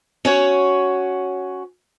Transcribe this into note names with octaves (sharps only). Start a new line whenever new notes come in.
C#4 F#4 C#5